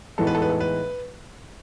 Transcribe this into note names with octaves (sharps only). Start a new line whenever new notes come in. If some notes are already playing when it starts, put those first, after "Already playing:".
A2 E3 G#3 B3 D#4 A4
B4
A4
B4
A4
B4